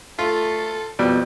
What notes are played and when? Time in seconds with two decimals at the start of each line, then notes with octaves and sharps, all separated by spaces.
0.19 A3 F4 A4
0.99 F2 B2 G3